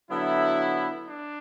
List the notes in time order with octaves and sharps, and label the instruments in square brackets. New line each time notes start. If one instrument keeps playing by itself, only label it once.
[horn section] D3 F#3 B3 E4
D4